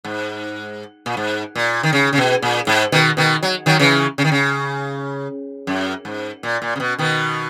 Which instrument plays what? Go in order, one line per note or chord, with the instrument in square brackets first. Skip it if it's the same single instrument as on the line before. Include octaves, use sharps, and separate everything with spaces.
[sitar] G#2
A#2
G#2
A#2
D#3
C#3
C#3
B2
A#2
G#2
B2 D#3
B2 D#3
F#3
D#3 F#3
C#3 E3
C#3
D#3
C#3
F#2
G#2
A#2
A#2
C#3
B2
B2 D#3